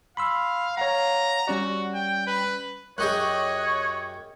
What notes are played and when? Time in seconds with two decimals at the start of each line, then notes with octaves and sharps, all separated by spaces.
0.17 F5 B5 C6 E6
0.77 C#5 F5 F#5 A#5
1.48 G3 C#4 F#4 D5
1.94 G5
2.27 B4
2.98 F#2 G4 G#4 C#5 D#5 C#6 F#6